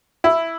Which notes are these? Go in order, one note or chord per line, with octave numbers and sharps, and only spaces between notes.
E4